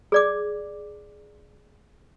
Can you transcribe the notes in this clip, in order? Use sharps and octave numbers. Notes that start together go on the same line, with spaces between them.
G#4 D5 D6